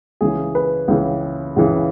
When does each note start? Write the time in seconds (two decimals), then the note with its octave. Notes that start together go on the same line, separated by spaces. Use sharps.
0.21 C#2 C#3 E3 G#4
0.55 B4
0.88 C#2 C#3 E3
1.56 C#2 C#3 E3